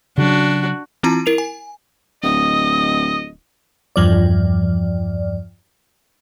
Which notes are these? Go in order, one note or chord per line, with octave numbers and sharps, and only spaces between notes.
C#3 F#3 D4 F#4
E3 C4 E4 F4 A5 A#5
E4 A#4 C7 F7
G#5
D1 D#5 D#6
E2 G2 F3 D5